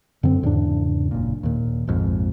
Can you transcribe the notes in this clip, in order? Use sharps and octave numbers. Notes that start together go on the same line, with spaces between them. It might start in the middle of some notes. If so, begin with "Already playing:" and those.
F#2 D3 C4
E2 G#2 C#3 D4
F#1 A#2
D#2 A#2
A#1 F2 G#2